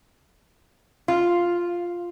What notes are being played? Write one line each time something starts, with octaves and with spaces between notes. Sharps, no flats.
F4